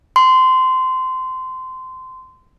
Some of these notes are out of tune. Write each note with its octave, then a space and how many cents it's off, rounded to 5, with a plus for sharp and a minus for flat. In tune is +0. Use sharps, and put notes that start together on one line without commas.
C6 -20